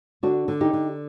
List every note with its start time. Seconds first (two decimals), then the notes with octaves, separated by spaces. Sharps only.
0.23 D3 D4 F#4
0.48 D3
0.61 D#4 G4
0.73 D3